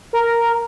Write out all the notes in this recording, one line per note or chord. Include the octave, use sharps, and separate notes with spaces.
A#4